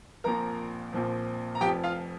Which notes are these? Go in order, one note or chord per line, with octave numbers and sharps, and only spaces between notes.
A#1 A#2 F3 C4 A#4 A#5
A#1 A#2 F3 C4
A#5
F1 F2 F3 G4 G5
F4 F5